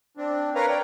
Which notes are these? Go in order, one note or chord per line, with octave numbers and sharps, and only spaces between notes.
C4 D4
A#4 B4 C#5 F5 A#5
D5 G5